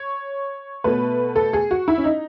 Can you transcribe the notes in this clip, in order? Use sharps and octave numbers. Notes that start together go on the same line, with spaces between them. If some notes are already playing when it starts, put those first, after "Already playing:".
Already playing: C#5
B2 A3 B4
A4
G#4
F#4
E4
C#4
D#4